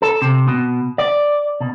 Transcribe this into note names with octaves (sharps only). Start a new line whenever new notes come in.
A4
C3
B2
D5
B2